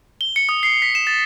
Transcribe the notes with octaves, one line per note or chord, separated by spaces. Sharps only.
G7
C#7
D#6
C7
B6
E7
A6